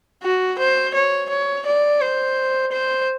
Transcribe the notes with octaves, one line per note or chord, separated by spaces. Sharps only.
F#4
C5
C#5
C#5
D5
C5
C5